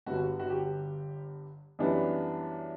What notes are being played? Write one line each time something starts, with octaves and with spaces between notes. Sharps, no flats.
G1 G2 D3 G3 B3 F#4
F#4
G4
F#2 E3 G3 B3 D4